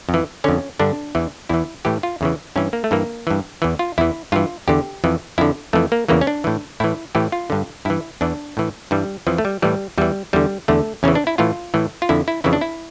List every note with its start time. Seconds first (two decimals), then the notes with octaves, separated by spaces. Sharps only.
0.09 F2
0.14 E3
0.44 F2 D3 C#4
0.79 G2 D3 D4
1.15 E2 E3
1.49 E2 E3 E4
1.85 A2 E3 G4
2.03 F4
2.21 E2 C#3 E3
2.56 G2 E3 C#4
2.73 A#3
2.84 A3
2.91 G2 E3 A#3
3.27 G2 E3
3.62 E2 E3
3.79 F4
3.98 E2 E3 E4
4.32 G2 E3 F4
4.68 E2 D3 G4
5.04 F2 E3
5.38 F2 D3 E4
5.73 F2 E3 A3
5.92 A#3
6.08 E2 C#3 E3 A#3
6.21 C#4
6.27 D4
6.44 A2 E3
6.80 A2 E3 E4
7.15 A2 E3 G4
7.32 F4
7.50 G2 D3
7.85 G2 E3 E4
8.21 E2 E3 D4
8.57 A2 E3
8.91 G2 E3 G3
9.27 F2 E3 F3
9.38 A3
9.45 G3
9.62 A2 E3 G3
9.98 E2 E3 G3
10.33 E2 D3 G3
10.68 E2 D3 A3
11.03 E2 C#3 E3 C#4
11.15 D4
11.27 E4
11.38 A2 E3 F4
11.74 A2 E3
12.02 F4
12.09 F2 D3 E4
12.28 E4
12.44 F2 C#3 E3 E4
12.53 D4
12.61 E4